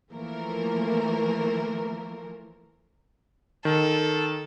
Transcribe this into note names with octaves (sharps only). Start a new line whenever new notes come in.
E3 F3 A3 A#3 A#4
D#3 A4